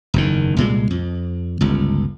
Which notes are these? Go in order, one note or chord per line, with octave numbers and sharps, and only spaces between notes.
F#1 E2 D#3
C2 A#2 G#3
F2
G1 C#2